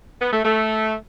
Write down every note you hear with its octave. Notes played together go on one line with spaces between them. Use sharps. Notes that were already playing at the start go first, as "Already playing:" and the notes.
B3
A3
A3